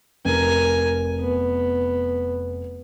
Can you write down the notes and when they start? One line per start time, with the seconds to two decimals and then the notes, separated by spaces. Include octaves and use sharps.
0.25 F1 A#4 G#5
1.20 B3